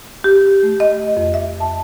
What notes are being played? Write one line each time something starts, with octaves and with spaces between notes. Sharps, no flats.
G4
A3
D#5
F2
E5
A5